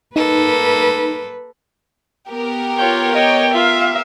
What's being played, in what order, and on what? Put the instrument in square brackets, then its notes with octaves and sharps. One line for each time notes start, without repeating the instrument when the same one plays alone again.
[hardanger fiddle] A#3 A4 [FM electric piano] D#4 [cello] B4
[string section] B3 G4 A#4
[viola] F4 C#5 [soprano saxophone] G5
[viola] C#5 G5 [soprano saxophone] D#5
[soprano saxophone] F4 [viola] E5 F5